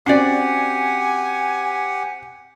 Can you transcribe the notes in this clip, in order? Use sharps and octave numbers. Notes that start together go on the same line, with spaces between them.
C4 C#4 F#4 G4 D5 F#5 G#5 C7